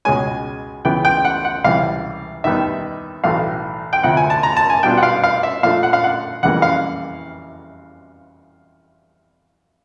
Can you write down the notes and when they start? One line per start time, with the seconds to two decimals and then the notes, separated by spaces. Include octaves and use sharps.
0.05 C#2 B2 G#3 C#4 G#5
0.85 C#2 C#3 E3 G#3 B3 G5
1.05 G5
1.25 F#5
1.45 F#5
1.64 C#2 C3 E3 G3 F5
2.44 D#2 D#3 G3 B3 D#4 E5
3.24 B1 A2 E3 A3 F5
3.93 G5
4.03 D2 C3 F3 F#5
4.17 G#5
4.30 A5
4.43 A#5
4.57 A5
4.70 G#5
4.83 B2 G3 B3 D4 F4 G5
4.97 F#5
5.03 F5
5.24 F5
5.43 E5
5.63 A#2 F3 A3 D4 F5
5.83 F#5
5.93 F5
6.04 F#5
6.43 F2 C#3 E3 G3 A#3 F#5
6.62 F5